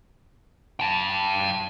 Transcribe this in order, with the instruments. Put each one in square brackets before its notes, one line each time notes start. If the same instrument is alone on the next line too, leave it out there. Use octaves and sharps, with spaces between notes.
[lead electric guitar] G5 A5